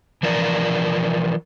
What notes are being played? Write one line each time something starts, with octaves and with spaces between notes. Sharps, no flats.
E3 F3 A#4 D5